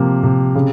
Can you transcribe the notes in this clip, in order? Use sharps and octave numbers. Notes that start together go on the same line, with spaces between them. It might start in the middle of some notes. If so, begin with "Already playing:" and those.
Already playing: C3 F3 A#3
C3
C#3